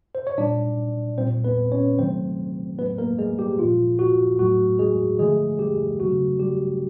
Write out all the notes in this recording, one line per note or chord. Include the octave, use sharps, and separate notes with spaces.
C5
C#5
A#2 G3 D4 D5
A#2 G3 C4 C5
B3 B4
C#4 C#5
C3 D#3 F#3 A3 C4 C5
A2 F#3 A3 B3 B4
A#3 A#4
G#3 G#4
G3 G4
A#2 F3 G#3 F4
F#4
A2 F#3 A3 F#4
G#3 G#4
D3 F3 G#3 A3 G#4
G3 G4
C#3 F#3 A3 F#4
G3 G4